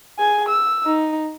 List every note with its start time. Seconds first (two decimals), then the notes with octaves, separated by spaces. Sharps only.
0.18 G#4 G#5
0.48 E6
0.86 D#4